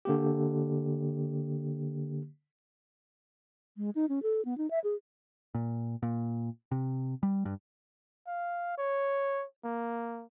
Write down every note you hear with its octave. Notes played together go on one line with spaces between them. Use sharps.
D3 A#3 G4
G#3
D#4
C#4
A4
B3
D#4
E5
G#4
A#2
A#2
C3
G3
G2
F5
C#5
A#3